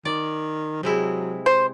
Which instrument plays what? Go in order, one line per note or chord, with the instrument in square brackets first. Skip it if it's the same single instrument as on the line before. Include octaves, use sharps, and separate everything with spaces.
[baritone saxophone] D#3 [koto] D5
[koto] C3 G#3 E4 [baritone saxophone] F#3
[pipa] C5